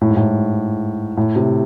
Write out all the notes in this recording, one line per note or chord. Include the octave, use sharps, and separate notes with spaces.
A2
G#2
A2
A2
C3